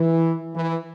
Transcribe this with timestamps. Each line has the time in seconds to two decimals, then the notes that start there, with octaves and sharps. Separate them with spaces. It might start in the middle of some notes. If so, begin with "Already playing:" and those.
Already playing: E3
0.54 E3